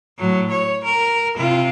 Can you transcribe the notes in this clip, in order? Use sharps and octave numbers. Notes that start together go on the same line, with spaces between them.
A2 F#3
C#5
A#4
C3 F4